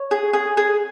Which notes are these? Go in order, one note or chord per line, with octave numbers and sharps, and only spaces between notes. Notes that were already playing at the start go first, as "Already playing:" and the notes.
Already playing: C#5
G#4
G#4
G#4